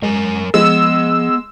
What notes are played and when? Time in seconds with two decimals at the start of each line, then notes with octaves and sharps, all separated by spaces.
0.02 F#2 G#3 A#4 G#5
0.54 F3 G#3 B3 E6